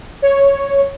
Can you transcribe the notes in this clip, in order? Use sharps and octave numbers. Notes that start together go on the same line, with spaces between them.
C#5